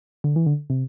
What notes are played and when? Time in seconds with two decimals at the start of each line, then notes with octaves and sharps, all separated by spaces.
0.24 D3
0.36 E3
0.46 D3
0.70 C3